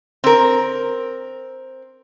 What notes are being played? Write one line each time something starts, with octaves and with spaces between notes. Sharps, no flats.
C4 A#4